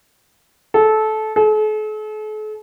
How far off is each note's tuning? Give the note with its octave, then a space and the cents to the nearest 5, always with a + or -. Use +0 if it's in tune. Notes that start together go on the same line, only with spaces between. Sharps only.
A4 -20
A4 -45